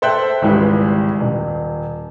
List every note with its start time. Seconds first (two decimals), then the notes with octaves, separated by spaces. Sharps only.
0.02 A4 C5 E5 G5 F#6
0.42 G#1 C#2 E3 G3 G#3
1.20 D#1